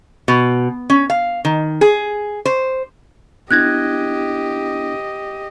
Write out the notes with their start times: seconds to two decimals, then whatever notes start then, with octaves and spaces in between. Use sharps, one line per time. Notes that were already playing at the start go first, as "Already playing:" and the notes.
0.28 B2
0.90 C#4
1.10 F5
1.45 D#3
1.81 G#4
2.45 C5
3.51 B3 D4 E4 G4 D#5 F#6 G#6 A#6